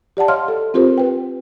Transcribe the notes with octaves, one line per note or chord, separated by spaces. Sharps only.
G4 D5 F#5 A5
C#5 D#5 F5 C6 F6
A4
C4 F4 G4 A#4 C5
B4 G5